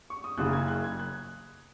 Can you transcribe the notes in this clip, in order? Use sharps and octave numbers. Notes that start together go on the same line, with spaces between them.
C#6
D#6
F#1 F#2 C#3 F#6
G#6
F#6
G#6
F#6